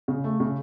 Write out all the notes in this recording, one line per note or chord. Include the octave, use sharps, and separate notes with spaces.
C#3
A3
C#3